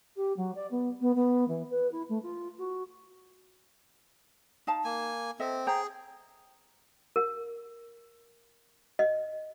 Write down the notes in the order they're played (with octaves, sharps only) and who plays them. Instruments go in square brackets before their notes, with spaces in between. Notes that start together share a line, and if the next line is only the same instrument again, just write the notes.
[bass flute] G4
F#3
D5
B3
B3
B3
E3
B4
E4
A3
F4
F#4
[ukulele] D#4 F5 A5
[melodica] A#3 G#5
[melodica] C4 [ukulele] A4 D#5 E5
[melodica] G#4 [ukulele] C5 G5 A#5
[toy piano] A#4
D#5